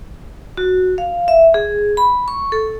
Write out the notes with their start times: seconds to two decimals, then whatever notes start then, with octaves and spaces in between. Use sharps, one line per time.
0.57 F#4
0.98 F5
1.28 E5
1.54 G#4
1.97 B5
2.28 C#6
2.52 A4